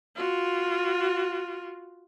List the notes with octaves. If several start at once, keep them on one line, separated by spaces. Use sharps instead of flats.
F4 F#4